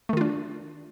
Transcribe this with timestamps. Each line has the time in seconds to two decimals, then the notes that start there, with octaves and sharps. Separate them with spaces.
0.09 A3
0.13 D#3
0.17 F4
0.21 D4